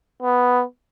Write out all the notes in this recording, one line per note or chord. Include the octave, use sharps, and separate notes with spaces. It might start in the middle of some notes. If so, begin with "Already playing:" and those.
B3